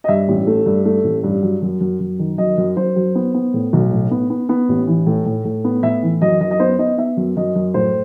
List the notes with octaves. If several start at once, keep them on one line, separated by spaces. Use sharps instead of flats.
D#5
G2 E5
A1
A3
G2
A3
A1
G2
F#3
F#2
F#2
F#2
D#3
F#2 D#5
F#2
F#2 C5
F#3
B3
B3
A2
B1
A2
B3
B3
B3
A1
E3
A2
A2
A2
B3
A2 E5
E3
F#2 D#5
F#2 D#5
D#5
B3 C5
B3 D#5
B3 E5
F#2
F#2 D#5
F#2
A2 C5